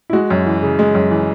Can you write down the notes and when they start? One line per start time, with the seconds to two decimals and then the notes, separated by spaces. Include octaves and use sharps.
0.10 E4
0.13 G#3 F#4
0.30 F#2
0.46 E3
0.62 C#3
0.79 G#3
0.95 F#2
1.11 E3